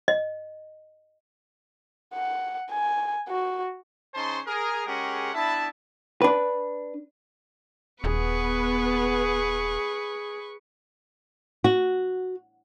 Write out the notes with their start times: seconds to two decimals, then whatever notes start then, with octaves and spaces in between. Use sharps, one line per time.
0.08 D#5
2.14 F#5
2.71 G#5
3.29 F#4
4.14 C#3 C#4 D#4 C5 A5 C6
4.47 G#4 A#4
4.86 G#3 C#4 G4 G#4 A#4 F#5
5.34 B3 D4 E4 E5 A5
6.22 D4 B4
8.04 D#1 B3 G#4 B4 C#6
11.64 F#4